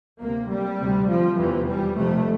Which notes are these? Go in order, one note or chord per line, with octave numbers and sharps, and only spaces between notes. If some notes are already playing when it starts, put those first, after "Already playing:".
D2 C3 A#3
G3
D2 C3
F3
F1 E2 C3 E3
G3
F1 F2 C3 A3